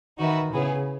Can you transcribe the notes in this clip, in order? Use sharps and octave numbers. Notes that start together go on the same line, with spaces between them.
D#3 D#4 F#4 B4 E5
C#3 B3 E4 G#4